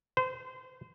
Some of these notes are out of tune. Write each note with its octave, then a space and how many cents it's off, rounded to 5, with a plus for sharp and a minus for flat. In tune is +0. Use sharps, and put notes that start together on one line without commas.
C5 -30